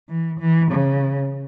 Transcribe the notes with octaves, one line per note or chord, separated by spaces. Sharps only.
E3
E3
C#3